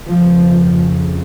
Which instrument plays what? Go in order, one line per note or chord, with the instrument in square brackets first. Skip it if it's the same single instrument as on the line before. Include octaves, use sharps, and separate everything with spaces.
[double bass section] F2 C#3 F3